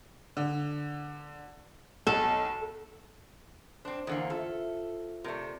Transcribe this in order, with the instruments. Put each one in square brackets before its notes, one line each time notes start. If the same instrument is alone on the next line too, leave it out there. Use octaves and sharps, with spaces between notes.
[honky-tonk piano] D3
[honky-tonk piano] B1 [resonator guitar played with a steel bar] A4
[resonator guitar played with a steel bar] C4 D4 [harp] C5
[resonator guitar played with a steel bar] E2 D3 A#3
[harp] F4 E5 [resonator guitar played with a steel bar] A4
[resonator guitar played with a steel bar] C3 A3 [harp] A#4 D5